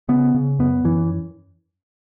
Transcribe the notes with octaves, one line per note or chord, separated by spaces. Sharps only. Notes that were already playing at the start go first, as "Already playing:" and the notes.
C#3 B3
C#3
F#2 B3
F#2 E3